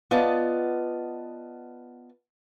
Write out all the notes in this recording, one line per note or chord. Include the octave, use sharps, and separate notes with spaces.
B3 F4 D5 D#5 A5